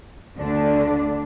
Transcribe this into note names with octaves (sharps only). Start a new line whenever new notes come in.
D2 D3 A3 D4